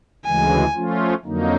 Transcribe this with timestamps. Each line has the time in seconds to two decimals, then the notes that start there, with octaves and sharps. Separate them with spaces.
0.25 D2 C#3 E3 G#3 G#5
0.74 F3 A3 C#4 F4
1.24 F2 D3 F#3 A#3 D#4